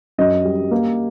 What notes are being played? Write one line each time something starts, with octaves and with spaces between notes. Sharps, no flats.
F#2 D#5
G3
A#3